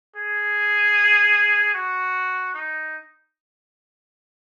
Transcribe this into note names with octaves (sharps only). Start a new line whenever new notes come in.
G#4
F#4
D#4